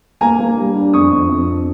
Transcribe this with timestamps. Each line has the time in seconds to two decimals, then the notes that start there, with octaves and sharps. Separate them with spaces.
0.21 A#3 G#5 A#5
0.39 A#3
0.57 G3
0.76 D4
0.93 F2 C#6 D#6
1.12 F2
1.29 F2